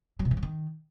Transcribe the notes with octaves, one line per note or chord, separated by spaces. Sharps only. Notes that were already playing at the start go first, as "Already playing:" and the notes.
F#3
B2
E3
F#3
D#3